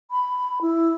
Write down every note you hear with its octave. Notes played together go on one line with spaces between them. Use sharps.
B5
E4